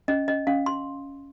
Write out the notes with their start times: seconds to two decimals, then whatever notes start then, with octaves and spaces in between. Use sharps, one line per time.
0.08 C#4 D#5
0.28 C#4 D#5
0.47 C#4 F5
0.66 C6